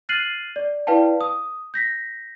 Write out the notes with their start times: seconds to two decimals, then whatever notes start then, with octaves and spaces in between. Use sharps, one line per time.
0.09 F6 F#6 A6 C7 D#7 F#7
0.56 D5
0.87 E4 B4 D5 F5 G5 A5
1.21 D#6
1.74 G6 A#6 B6